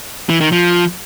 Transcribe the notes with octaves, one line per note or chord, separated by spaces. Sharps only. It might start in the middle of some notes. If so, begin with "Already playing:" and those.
E3
D#3
F3